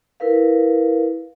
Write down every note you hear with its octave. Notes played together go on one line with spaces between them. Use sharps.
E4 A#4 B4 F5